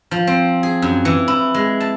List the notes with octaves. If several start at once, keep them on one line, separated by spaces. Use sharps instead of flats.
F3
C4
G#4
F#2
E3
E4
G#3
A5